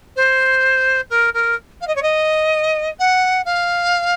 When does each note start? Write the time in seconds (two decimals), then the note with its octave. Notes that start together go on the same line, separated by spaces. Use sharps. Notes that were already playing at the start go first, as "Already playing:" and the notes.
0.16 C5
1.10 A#4
1.33 A#4
1.81 F5
1.87 D#5
1.95 C#5
2.02 D#5
2.99 F#5
3.45 F5